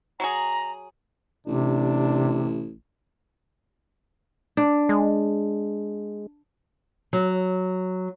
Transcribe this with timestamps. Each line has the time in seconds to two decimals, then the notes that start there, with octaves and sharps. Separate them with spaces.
0.20 F#3 F#4 G#4 A#5
1.47 A1 C3 D4
4.57 D4
4.89 G#3
7.13 F#3